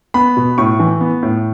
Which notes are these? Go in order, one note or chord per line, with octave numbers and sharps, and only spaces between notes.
B3 B5
B2
A2 C#6
E3
B3
A2